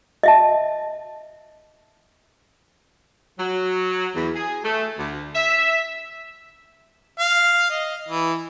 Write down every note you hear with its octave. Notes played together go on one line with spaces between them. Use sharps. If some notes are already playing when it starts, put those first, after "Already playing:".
D#5 E5 A5
F#3
E2
G#4
A3
D2
E5
F5
D#5
E3